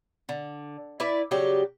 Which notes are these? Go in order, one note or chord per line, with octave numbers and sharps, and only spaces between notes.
D3
E4 B4 D5
C#3 F#3 G3 G4